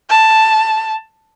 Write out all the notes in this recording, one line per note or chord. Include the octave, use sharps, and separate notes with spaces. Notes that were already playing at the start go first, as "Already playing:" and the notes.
A5